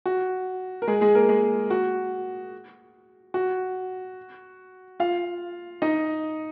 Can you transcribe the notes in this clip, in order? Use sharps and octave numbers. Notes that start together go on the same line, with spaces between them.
F#4
A#4
G#3 G#4
G#3 G#4
A#3 A#4
G#3 G#4
F#4
F#4
F4 F5
D#4 D#5